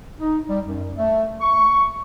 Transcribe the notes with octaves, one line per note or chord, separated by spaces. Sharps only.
D#4
G3
F#2
A3
C#6